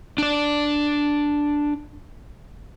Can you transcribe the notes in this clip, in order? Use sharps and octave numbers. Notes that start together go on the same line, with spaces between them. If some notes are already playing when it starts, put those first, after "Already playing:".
D4 D5